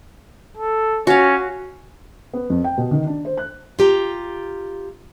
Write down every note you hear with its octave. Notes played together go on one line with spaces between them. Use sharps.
A4
C#4 F#4 F5
B3
F2
G5
B2
D#3
D4
C5
F#6
F4 G4 A#5